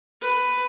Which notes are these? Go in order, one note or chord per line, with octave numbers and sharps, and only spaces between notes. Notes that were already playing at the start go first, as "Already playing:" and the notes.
B4